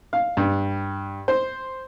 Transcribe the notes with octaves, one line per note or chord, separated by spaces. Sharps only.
F5
G2
C5